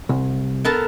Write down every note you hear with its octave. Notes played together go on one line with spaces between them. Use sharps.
C2
B3 A4 A#4